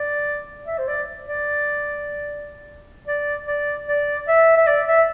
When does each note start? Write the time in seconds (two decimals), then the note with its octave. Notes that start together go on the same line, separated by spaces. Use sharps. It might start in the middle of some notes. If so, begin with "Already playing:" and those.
Already playing: D5
0.67 E5
0.78 C5
0.88 D5
1.27 D5
3.07 D5
3.47 D5
3.88 D5
4.28 E5
4.57 E5
4.67 D5
4.88 E5